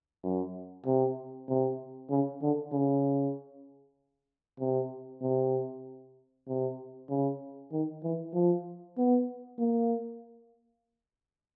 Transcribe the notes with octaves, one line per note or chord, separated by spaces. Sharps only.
F#2
C3
C3
C#3
D3
C#3
C3
C3
C3
C#3
D#3
E3
F3
B3
A#3